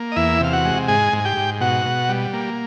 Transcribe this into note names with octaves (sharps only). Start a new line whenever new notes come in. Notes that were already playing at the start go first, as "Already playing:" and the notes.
Already playing: A#3
D#5
E2 E4 E5
C3 F5
F#4 F#5
G#3
G#2 G#4 G#5
G#2
G#5
G4 G5
G#2
B2 F#4 F#5
B2
G3
A#3